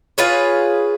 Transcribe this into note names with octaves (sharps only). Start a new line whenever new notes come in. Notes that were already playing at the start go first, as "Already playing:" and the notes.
F4 G#4 B4 C#5